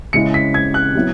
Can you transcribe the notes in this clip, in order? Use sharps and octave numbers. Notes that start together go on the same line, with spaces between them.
C#3 G#3 C#4 E4 C#7
B6
G#6
F#6
F#3 B3 E4